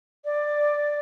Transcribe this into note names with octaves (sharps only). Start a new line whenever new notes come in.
D5